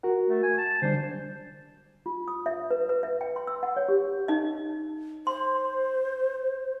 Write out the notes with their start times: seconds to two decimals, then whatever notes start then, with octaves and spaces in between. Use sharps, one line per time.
0.03 F#4 A#4 F#5
0.29 A3
0.43 G#5
0.58 A5
0.82 D3 G3 D4 C5
2.06 F4
2.28 D#6
2.46 E5
2.71 B4
2.89 B4
3.03 E5
3.21 G5
3.36 C6
3.47 E6
3.63 F#5
3.76 C#5
3.89 G4
4.28 D#4 D#5
5.27 C5 C6